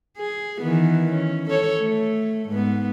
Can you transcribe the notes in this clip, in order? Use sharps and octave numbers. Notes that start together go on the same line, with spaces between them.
G#4
D#3 E3 B3
C#4
A4 C#5
A3
G#2 B3